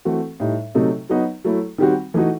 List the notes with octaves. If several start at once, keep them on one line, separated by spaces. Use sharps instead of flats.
E3 A3 C4 F#4
A2 G3 D#4
C3 F#3 A3 D#4
F#3 B3 D#4 F#4
F#3 A3 E4
D#3 G3 C4 F#4
E3 A3 D#4 F#4